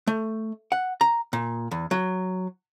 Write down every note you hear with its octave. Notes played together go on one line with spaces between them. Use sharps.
A3
F#5
A#5
A#2
E2
F#3